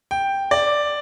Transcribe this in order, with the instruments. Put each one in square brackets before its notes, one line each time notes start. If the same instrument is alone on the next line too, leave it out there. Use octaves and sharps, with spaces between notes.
[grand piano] G5
D5